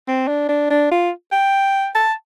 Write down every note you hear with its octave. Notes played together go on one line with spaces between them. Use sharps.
C4
D4
D4
D4
F4
G5
A5